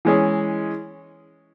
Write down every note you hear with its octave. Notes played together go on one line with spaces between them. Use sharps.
E3 G#3 C#4 G#4